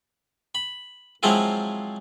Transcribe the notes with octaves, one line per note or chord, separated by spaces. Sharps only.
B5
F3 F#3 G#3 C4 E4 F4